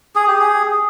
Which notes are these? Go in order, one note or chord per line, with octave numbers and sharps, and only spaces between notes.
G#4
G4
G#4